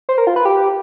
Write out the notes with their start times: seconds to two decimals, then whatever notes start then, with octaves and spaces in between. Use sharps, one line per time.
0.09 C5
0.18 A#4
0.27 F4
0.36 B4
0.45 G4